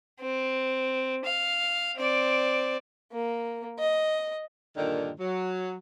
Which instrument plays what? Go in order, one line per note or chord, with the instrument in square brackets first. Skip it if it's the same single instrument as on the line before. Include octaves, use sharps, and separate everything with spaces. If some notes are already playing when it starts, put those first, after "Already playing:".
[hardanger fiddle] C4
F5
C4 D5
A#3
D#5
[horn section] G2 A#2 D3 D#3
F#3